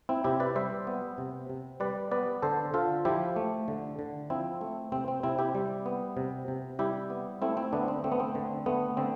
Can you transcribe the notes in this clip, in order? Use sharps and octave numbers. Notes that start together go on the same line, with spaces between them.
C4 E4
C3 E4 G4
B4 D5
G3 C5 E5
B3
C3
C3
G3 B4 D5
B3 B4 D5
D3 A4 C5
D3 F4 A4
F3 E4 G4
A3
D3
D3
F3 C4 E4
A3
C3 C4
C4
C3 C4 E4
E4 G4
G3
B3
C3
C3
G3 E4 G4
B3
A3 C4 E4
C4 E4
D3 B3 D4
C4
A3 C4
B3
C4
D3
A3 B3
D3 C4